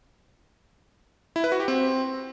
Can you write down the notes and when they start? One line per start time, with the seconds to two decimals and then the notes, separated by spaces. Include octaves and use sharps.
1.36 E4
1.44 B4
1.52 F#4
1.60 G4
1.68 C4